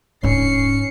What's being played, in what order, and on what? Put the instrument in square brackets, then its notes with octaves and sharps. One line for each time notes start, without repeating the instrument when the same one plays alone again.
[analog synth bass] D#1 [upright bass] G#2 D4 [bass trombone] C#4 [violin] C7 C#7